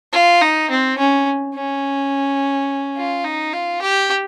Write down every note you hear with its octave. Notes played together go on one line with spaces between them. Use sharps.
F4
D#4
C4
C#4
C#4
F4
D#4
F4
G4